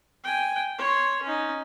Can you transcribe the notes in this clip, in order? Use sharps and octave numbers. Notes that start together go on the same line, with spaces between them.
G5 G#5
C#5 C6
C#4 D#4